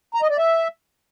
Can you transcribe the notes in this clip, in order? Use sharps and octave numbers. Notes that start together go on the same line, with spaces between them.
A#5
D#5
D5
E5